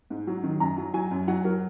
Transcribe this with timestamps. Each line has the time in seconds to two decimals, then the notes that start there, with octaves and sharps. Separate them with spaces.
0.10 G#2
0.27 F#3
0.43 D#3
0.60 F#2 A#5
0.77 F#3
0.94 F#3 G#5
1.11 F#2
1.28 F#3 F#5
1.45 F#3 A#4